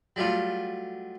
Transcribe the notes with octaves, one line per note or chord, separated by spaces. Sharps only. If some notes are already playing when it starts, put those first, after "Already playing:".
F#3 G3 A3 F4